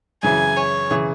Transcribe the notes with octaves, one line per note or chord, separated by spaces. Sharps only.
F#2 C#3 E3 G#5
C#5
C#3 E3